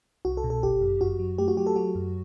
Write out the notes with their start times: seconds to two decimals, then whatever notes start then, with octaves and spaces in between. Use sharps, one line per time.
0.25 C2 F#4
0.37 A4
0.44 B2
0.50 A4
0.62 G1 G4
0.81 F#2
1.01 F#2 F#4
1.19 F#3
1.38 A3 G4
1.48 F#4
1.57 F#3 G4
1.67 A4
1.76 F#3 F#4
1.95 F#2